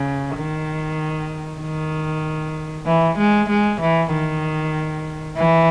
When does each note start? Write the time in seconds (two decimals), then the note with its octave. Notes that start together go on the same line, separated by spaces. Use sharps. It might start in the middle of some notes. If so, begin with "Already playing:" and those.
Already playing: C#3
0.36 D#3
1.61 D#3
2.86 E3
3.18 G#3
3.49 G#3
3.80 E3
4.11 D#3
5.36 E3